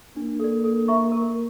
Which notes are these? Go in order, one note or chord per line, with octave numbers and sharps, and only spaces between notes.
A#3 D4
A4 D5
A4
E5 A#5 C#6
A#4